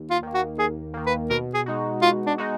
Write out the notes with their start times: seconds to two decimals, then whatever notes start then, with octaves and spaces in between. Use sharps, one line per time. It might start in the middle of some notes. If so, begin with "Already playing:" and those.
Already playing: D#2
0.11 F4
0.23 D#3 A#3
0.34 F#4
0.58 D#2 G#4
0.94 D#3 A#3
1.06 B4
1.30 B2 A#4
1.54 G#4
1.66 G#3 D#4 F#4
2.02 B2 F4
2.26 D4
2.38 G#3 D#4 F#4